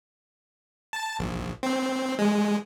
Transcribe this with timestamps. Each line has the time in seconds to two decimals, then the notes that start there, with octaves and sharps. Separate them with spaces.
0.93 A5
1.19 A#1
1.63 C4
2.19 G#3